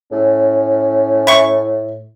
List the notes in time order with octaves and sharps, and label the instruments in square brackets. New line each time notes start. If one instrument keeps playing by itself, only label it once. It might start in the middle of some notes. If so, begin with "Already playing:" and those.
[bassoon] A2 [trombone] C#4
[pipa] E4 C#6